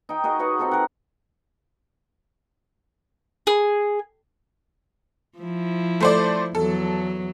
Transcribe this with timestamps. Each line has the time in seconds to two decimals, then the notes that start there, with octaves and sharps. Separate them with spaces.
0.09 D#4 G5
0.24 F#4 G#4 A#4 D#5
0.39 F#4 B4 C#5 F#5
0.59 C4 D#4 F4 A4
0.71 A#4 F#5
3.47 G#4
5.39 F3 E4
6.00 A3 C5 D5
6.55 E2 F#3 A4